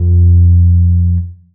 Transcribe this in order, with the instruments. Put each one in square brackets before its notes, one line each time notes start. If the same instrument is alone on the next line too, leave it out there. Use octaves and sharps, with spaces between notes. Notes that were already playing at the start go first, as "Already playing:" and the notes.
Already playing: [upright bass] F2